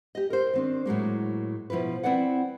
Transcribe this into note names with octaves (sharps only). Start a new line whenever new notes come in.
G4 D#5
A#4 C5
D#3 C4 D4
A2 F#3 G#3 A#3
B2 F3 E4 F4 B4
C4 E4 B4 D5 F#5